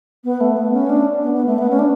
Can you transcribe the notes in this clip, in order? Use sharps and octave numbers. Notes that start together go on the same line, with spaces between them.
B3
A3
B3
C#4
D4
B3
B3
A3
B3
C#4
D4